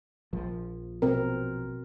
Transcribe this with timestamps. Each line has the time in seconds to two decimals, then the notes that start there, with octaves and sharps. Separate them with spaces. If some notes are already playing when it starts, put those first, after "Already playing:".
0.33 A#1 F3
1.02 B2 C4 A#4